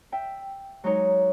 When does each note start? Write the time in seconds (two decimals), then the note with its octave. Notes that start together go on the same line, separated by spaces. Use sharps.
0.12 E5 G5
0.84 F#3 G#3 D#4 C#5